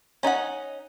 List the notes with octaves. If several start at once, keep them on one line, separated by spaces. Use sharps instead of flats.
C#4 D#4 D#5 F#5